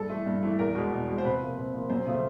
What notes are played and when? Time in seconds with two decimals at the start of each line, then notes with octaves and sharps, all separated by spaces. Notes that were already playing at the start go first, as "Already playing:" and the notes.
Already playing: G2 A4
0.10 E3 A3
0.26 G2
0.43 E3 A3
0.59 E2 A#4
0.75 B2 G#3
0.92 E2
1.08 B2 G#3
1.18 C5
1.25 C3 B4
1.40 F3 A#3
1.58 C3
1.74 F3 A#3
1.90 F#2 C5
2.07 C#3 F3 A3